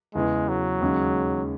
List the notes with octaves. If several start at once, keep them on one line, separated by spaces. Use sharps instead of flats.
E2 C#3 E3 G#3
F#3
D#2 C#3 G#3 C#4